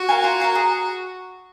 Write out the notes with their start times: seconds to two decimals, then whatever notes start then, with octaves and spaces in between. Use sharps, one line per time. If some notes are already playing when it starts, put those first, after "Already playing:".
Already playing: F#4
0.09 A#4 F5 G#5
0.24 F4
0.40 A#4 F5 G#5
0.55 G#4